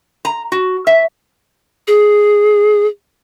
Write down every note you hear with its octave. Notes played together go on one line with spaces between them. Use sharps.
A#5
F#4
E5
G#4